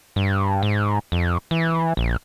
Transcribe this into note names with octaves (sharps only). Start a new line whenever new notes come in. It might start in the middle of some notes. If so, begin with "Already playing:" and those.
G2
G#2
F2
E3
A#1